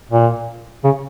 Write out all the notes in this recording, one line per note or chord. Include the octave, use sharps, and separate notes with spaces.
A#2
C#3